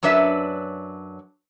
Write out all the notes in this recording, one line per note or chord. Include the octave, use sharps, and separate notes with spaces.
F#2 F#3 D4 B4 E5